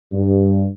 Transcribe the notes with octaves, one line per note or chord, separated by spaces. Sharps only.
G2